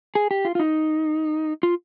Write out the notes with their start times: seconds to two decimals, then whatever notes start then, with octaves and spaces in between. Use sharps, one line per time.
0.15 G#4
0.31 G4
0.45 F4
0.55 F4
0.60 D#4
1.63 F4